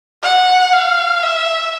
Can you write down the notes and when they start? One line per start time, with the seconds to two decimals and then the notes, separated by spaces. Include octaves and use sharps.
0.23 F#5
0.72 F5
1.22 E5